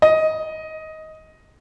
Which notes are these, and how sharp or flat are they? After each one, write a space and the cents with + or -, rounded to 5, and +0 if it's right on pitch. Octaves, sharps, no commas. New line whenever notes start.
D#5 +15